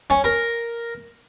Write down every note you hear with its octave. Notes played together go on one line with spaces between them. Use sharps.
C#4
A#4